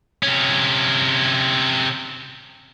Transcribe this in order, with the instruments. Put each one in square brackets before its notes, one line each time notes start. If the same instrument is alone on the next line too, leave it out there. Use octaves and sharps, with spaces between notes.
[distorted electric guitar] C3 C#4